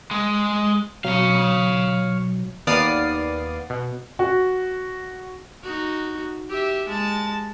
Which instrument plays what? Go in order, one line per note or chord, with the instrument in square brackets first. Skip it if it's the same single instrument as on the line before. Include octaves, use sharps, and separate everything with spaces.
[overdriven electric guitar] G#3
[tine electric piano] B2 F#3 [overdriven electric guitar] C#5 F5
[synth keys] D#2 B3 D5 F5 D#6 C7
B2
[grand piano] F#4
[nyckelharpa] D#4 F#4
G4 E5
G#3 A5